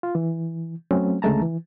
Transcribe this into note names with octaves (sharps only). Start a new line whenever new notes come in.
F4
E3
F#3 A3 C4 C#4
D2 C#3 G#3 A3 A5 A#5
E3